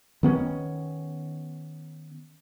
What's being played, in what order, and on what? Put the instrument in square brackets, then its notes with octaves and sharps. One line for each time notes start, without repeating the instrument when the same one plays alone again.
[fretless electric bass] D#3 B3 C#4